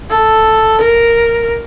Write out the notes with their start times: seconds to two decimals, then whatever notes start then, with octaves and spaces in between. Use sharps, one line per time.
0.11 A4
0.82 A#4